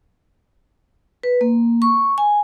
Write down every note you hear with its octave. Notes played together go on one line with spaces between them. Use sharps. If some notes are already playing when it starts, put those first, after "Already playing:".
B4
A#3
C#6
G#5